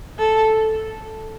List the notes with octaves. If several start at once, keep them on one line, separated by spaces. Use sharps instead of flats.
A4